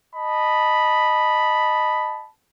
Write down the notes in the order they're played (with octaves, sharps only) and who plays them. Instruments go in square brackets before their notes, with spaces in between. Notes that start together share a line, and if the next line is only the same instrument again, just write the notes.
[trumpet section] D#5 A5 B5